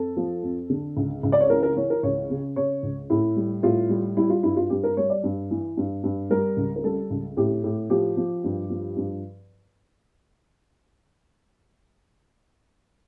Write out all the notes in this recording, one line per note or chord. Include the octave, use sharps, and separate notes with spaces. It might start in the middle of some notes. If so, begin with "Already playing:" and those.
Already playing: F2 A4
F3
F2
D3
C#2
C#2
D5
C#5
E3 A#4
A#4
E3 C#5
A#4
C#2 C#5
C#3
C#3 C#5
C#2
A2 E4
G3
A2 F4
G3
G3 E4
F4
G2 E4
F4
G2 G4
A#4
G3 C#5
D5
G2
E3
G2
G2
G3 A#4
C#2
A#4
G3 A4
C#2
A2 G4
A2
F3 G4
F3
G2
F3
G2